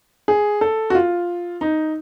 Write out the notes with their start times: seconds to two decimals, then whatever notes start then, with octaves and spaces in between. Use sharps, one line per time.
0.28 G#4
0.61 A4
0.90 F#4
0.95 F4
1.61 D#4